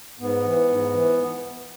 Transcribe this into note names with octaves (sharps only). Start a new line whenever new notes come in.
G#2 B3
E3
G#2
E3